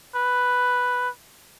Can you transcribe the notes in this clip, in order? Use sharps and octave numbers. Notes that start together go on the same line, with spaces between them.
B4